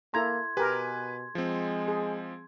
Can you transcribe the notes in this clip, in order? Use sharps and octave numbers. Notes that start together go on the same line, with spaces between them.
A#3 E4 A4 A#5 C6 G#6
B2 G4 A#4 B4 G#5
F3 G#3 C4
G#4